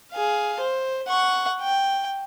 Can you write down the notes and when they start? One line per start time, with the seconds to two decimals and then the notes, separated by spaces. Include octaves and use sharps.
0.12 G#4 F5
0.60 C5
1.07 F#5 C#6
1.61 G5